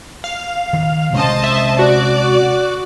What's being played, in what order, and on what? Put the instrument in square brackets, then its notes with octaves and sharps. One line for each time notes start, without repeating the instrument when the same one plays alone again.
[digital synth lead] F5
[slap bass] D#3
[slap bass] C3 G#3 C#4 [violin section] C5 D#5 A5
[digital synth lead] E5
[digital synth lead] F#4 [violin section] D5